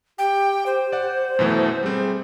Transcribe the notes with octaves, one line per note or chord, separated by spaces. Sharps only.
G4 G5
C5
D5 F#5
F#2 B2 E3 A3
G3 C4 G#4